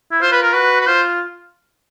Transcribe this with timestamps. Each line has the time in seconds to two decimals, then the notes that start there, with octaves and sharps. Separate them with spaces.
0.12 E4
0.22 F4 C5
0.32 B4
0.42 A#4
0.53 F#4 B4
0.81 B4
0.87 F4 C5